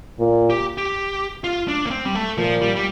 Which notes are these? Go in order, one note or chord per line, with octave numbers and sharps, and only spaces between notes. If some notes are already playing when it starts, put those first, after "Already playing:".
A#2
G4
G4
F4
D4
A#3
C4
G3
A3
A#2 F3
G3
G3